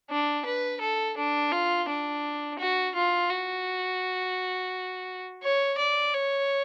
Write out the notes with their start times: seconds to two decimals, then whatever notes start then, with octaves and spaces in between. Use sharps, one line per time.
0.10 D4
0.46 B4
0.81 A4
1.17 D4
1.52 F4
1.88 D4
2.59 F#4
2.95 F4
3.30 F#4
5.43 C#5
5.78 D5
6.13 C#5